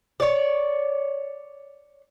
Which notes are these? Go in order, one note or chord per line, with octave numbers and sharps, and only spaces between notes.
C#5 D5